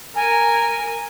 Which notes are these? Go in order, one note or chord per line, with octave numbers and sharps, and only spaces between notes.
A#4 G#5